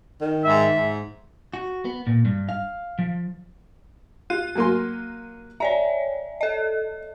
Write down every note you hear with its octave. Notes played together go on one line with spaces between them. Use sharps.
D#3
G#2 E5
G#2
F#4
B3
A#2
G2
F5
F3
F4 F#6 D#7
F#3 A#3 C6
C#5 D5 E5 A#5
A4 D#5